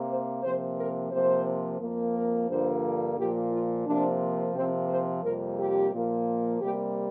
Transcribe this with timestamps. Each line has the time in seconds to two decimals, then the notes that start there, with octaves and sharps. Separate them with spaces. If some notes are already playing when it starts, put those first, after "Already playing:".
Already playing: C3 A#3
0.09 C5
0.43 C3 F3 A#3 C5
0.77 A#4
1.12 C3 F3 A#3 C5
1.80 F2 F3 A#3
2.14 A#4
2.49 G2 D3 F3 A#3 C5
3.18 A#2 F3 A#3 G4
3.52 F4
3.86 C3 F3 A#3 D4
4.55 C3 F3 A#3 C4
4.89 C5
5.23 F2 C3 G3 A#3 A#4
5.58 G4
5.92 A#2 F3 A#3
6.61 C3 G3 A#3 G4